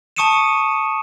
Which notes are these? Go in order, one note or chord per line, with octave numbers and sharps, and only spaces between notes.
A5 C#6 D#6 C#7 D#7 E7